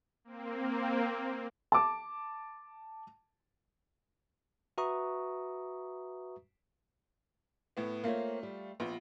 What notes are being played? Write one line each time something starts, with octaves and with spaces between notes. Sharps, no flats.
A#3 C4
A5 D6
F#4 B4 E5 A#5 C#6 D#6
A2 B3
A3 A#3 C4 F4 C#5
G3
A#1 B3 F4